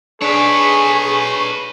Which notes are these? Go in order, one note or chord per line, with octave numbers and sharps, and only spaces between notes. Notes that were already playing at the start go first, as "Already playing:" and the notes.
D4 G#4 B4 C#5 C#6